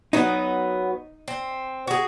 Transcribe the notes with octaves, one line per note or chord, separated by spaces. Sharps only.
F#3 B3 D#4
C4
F#4 G#4